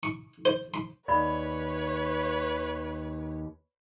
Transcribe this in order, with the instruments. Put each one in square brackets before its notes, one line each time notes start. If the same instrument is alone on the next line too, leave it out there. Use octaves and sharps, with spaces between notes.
[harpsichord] C#6
C5
C6
[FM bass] D#2 [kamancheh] B4 C#5 [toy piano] D5 B5